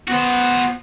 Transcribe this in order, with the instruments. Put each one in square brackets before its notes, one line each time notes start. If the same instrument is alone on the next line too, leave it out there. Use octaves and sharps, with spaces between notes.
[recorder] B3 [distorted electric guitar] F#4 C5